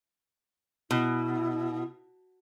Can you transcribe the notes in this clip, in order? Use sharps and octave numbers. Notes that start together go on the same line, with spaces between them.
B2 E4